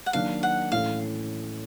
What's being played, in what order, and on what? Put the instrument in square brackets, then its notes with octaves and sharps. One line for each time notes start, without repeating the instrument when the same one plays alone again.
[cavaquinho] F#5
[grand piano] D#3 F#3 A#3 D4 [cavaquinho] F5
[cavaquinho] F#5
[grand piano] A2 E3 A3 C#4 [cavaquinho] F5